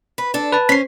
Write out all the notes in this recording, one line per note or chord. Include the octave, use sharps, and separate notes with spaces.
B4
D4 A4
B4 A5
C#4 C5 B6 C7